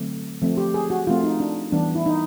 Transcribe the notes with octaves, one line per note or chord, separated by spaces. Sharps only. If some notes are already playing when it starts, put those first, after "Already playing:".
Already playing: D3 F#3 A3 C4
F3 A3 C4
G4
G#4
F#4
F3 A3 C4 F4
D#4
D4
E3 G3 B3 D4
E4
D#4